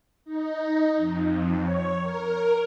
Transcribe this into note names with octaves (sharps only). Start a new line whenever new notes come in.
D#4
F2
C#5
A#4